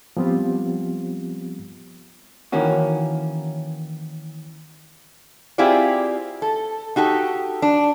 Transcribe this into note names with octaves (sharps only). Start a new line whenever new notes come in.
F3 G3 B3 C4 F4 G4
D#3 E3 A#3 C#4 F#4
C4 E4 F4 G4 G#4 D5
A4
D#4 F#4 G4 A4
D4